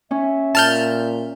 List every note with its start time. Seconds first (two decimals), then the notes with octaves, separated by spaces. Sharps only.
0.11 C#4 E5
0.55 A#2 A5 F6 G6